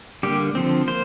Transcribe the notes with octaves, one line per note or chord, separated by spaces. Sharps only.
D3 G3 A#3 G4
D3 F3 C4
A#3 C5